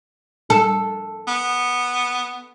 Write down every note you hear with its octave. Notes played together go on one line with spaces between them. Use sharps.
A4
B3